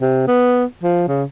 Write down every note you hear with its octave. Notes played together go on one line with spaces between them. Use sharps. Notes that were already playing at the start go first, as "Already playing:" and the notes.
C3
B3
F3
C#3